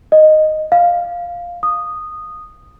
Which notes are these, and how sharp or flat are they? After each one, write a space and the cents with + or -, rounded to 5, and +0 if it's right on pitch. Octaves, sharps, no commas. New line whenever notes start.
D#5 -5
F5 +0
D#6 -10